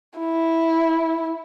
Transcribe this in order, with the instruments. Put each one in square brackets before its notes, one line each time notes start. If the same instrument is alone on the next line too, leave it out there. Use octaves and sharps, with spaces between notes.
[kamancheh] E4